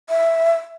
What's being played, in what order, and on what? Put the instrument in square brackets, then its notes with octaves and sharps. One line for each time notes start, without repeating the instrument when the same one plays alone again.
[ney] E5